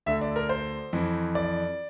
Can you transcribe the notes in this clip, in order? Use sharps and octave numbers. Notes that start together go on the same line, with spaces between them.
D2 D3 E5
D5
A#4
C5
F2 E3
D5